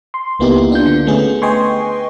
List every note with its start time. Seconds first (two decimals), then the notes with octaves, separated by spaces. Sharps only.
0.14 C6
0.39 C#2 A#3 B3 D#4 E4 G4
0.72 D4 F4 G6
0.85 D3
1.07 A3 B3 C#4 G#4
1.42 B4 D#5 G5 G#5 C6 C#6